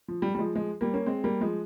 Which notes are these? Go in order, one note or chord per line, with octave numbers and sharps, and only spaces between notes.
F3
G3
G3
F3 G#3
F3 G#3
G3 A#3
A#3 C#4
G#3 C4
G3 A#3
F3 G#3